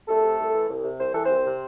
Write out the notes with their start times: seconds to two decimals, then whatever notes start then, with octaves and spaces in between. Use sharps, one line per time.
0.08 C2 A3 A4
0.23 C3
0.38 C2
0.54 E3
0.69 C2
0.84 C3
0.99 C2 C5
1.13 E3 A4
1.25 C2 C4 C5
1.45 C3